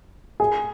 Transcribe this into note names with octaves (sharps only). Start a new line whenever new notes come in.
G#4